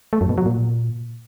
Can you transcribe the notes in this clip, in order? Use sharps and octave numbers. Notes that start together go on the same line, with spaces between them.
A3
F#2
B2
F#3
A#2